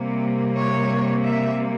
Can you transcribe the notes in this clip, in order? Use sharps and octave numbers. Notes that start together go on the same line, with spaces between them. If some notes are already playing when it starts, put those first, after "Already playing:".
Already playing: C3 G3 A#3
C#5
E5